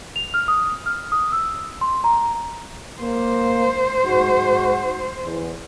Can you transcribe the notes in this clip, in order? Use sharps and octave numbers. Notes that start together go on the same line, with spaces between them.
F7
F6
D#6
F6
D#6
E6
C6
A#5
A#3 C5
G#2 F#4
E2